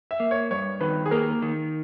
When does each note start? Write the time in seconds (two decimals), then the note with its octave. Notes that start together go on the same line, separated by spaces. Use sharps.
0.11 E5
0.20 A#3
0.31 C#5
0.51 G2 C#5
0.81 D#3 B4
1.06 G#4
1.11 A#3 A#4
1.42 D#3